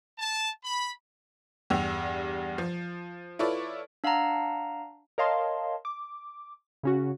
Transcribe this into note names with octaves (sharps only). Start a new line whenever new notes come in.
A5
B5
E2 G2 G3 G4 E6 F7
F3
E4 F4 A4 B4 C#5 D5
D4 F5 F#5 A5 A#5
A#4 C#5 D#5 F5 A5 C6
D6
C#3 C#4 F#4